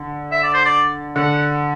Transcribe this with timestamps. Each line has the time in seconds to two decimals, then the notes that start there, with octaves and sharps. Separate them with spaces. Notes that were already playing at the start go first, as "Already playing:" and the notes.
Already playing: D3
0.32 E5
0.43 D5
0.54 C5
0.65 D5
1.16 D3 F#5